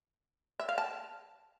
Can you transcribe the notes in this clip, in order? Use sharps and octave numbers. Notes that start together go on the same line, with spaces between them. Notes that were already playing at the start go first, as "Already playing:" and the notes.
E5
F5
A5